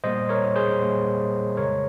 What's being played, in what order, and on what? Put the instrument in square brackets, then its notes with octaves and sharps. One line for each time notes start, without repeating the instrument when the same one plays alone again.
[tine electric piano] A#2 G3 A#3 C5 D#5
A#4 C#5
G#4 C5
A#2 G3 A#3
F2 C#3 G#3 A#4 C#5